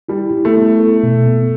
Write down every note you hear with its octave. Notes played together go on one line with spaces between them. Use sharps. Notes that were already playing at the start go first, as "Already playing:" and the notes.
G3 E4
E4
A3
B3
A4
B2
B3